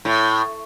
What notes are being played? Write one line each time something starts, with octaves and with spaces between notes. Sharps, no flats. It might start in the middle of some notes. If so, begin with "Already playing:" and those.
A2